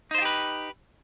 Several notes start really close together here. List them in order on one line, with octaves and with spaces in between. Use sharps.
D#4 C5 F4 G4 B4